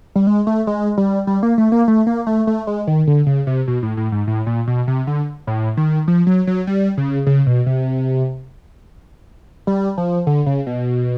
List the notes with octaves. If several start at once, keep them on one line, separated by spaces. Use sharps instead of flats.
G3
G#3
A3
G#3
G3
G3
A#3
A3
A#3
A3
A#3
A3
A3
G#3
D#3
D3
C#3
C3
B2
A2
A2
G#2
A2
A#2
B2
C3
D3
A2
D#3
F3
F#3
F#3
G3
C#3
C#3
B2
C3
G3
F3
D3
C#3
B2